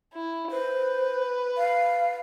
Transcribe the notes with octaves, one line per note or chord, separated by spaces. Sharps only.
E4
B4 C5
F5